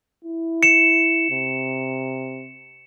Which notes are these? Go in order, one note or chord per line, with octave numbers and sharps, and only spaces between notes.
E4
C#7 E7
C3